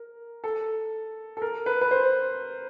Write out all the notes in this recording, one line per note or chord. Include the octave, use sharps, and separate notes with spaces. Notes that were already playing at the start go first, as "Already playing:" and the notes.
Already playing: A#4
A4
A4
A#4
B4
B4
C5